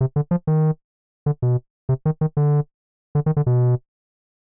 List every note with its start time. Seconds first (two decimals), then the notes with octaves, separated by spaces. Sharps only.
0.01 C3
0.16 D3
0.31 F3
0.47 D#3
1.26 D3
1.42 B2
1.89 C3
2.06 D#3
2.21 D#3
2.37 D3
3.15 D3
3.26 D#3
3.37 D3
3.46 B2